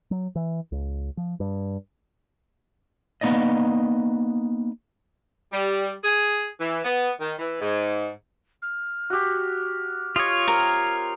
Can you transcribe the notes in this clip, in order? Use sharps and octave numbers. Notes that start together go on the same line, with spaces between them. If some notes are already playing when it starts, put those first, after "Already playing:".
F#3
E3
C#2
F3
G2
A#3 B3 D#4 D5 D#5
G3
G#4
E3
B3
D#3
E3
G#2
F6
F#4 G4
F4 G4 C#5 D#5
C4 G4 A#4 F6